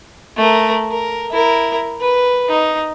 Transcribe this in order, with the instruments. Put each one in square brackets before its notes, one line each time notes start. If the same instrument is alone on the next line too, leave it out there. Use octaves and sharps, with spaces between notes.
[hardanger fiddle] A3 A#4
A#4
E4 A#4
B4
D#4